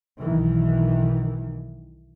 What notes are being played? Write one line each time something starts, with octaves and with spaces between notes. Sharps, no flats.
B1 D#3 E3